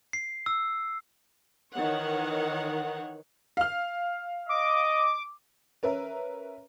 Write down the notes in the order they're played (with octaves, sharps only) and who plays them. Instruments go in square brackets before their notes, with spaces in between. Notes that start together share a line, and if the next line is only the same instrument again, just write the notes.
[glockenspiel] C7
E6
[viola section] D#3 E3 C#5 F#5
[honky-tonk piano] F5 F6
[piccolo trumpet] D#5 [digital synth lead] D6
[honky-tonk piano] C#4 A#4 B4 E5